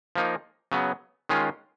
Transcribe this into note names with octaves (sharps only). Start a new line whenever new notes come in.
F3 A#3 D#4
C#3 F#3 B3
D#3 G#3 C#4 F4